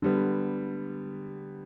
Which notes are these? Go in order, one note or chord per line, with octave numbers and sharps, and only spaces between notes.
D3 G3 B3